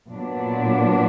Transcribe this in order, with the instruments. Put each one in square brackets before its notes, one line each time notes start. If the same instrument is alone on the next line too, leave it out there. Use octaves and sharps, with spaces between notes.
[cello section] A#2 F#3 B3 D4